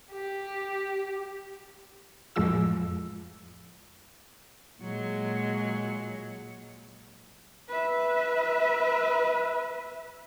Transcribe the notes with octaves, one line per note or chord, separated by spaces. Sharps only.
G4
F2 A2 F3 G#3 F4 E6
A#2 F#3 G#3
B4 E5